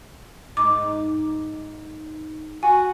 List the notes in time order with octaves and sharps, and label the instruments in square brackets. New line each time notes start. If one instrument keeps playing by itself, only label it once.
[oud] G#2 D#4 [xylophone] D6
[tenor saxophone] F#4 [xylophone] G#5